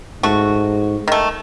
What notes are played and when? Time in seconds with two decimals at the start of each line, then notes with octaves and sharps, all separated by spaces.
0.23 G#2 A3 F#4
1.08 D#3 A3